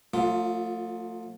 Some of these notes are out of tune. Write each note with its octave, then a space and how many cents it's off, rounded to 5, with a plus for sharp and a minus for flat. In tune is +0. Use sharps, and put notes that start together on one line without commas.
F3 +45 A3 +35 F4 +0